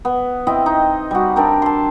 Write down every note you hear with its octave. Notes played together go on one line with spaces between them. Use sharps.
B3
C4 E4 D#5 G5
D#4
G3 F#4
C4 D4 G4 A#4
A5 C6